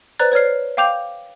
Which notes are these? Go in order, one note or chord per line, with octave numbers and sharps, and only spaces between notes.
B4 C5 D5 A#5 F#6 A6
B4 C#5 D5 F6 C7
F5 G5 D6 G6 F7